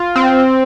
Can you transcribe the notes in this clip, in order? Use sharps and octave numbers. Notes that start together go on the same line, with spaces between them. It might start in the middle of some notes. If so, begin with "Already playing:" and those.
Already playing: F4
C4